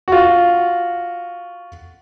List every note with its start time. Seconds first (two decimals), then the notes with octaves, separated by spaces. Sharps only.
0.08 F4 F#4